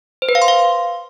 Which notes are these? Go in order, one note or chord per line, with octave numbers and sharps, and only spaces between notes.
C5
B4
F5
C6
F5